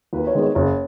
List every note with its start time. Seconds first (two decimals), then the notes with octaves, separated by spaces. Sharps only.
0.13 D#2 B4
0.27 C#5
0.35 D#3 G#3 B3
0.42 C#5
0.55 F#1 C#5